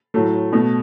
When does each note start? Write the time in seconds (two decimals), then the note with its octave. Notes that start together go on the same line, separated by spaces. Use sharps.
0.14 A2 F#3 A3
0.53 B2 A3